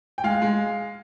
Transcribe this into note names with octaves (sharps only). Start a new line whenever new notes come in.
G5
G#3 F5
G#3